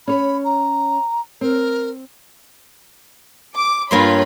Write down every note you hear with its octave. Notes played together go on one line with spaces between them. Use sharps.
C#4 C#5 B5
A#5
C4 A#4
D6
G2 A#3 F4 C#5 B5 C6